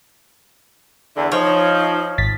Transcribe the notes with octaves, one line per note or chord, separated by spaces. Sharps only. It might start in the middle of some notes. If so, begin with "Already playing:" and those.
E2 D3 E5
F3 D#4 C#5
G#1 A6 B6